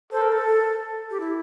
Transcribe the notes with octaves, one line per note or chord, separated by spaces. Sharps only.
A4 C5
A#4
A4
G4
E4